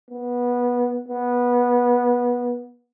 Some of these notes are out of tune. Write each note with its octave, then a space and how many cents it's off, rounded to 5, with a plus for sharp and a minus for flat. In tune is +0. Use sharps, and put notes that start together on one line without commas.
B3 -20
B3 -20